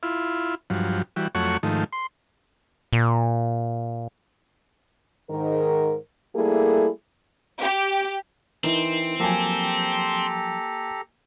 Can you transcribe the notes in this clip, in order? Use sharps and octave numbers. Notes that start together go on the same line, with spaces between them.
E4 F4
G2 F3 F#3
E3 G3 F#4
F2 F#3 A3 C#5 F#5 C#6
G#2 D#3 F3 A3
C6
A#2
G#2 D#3 A#4
G3 A3 A#3 E4 G#4 A4
G4
E3 C4 D#4 A#4
F3 F#3 A#3 G4 A4 G#5 A#5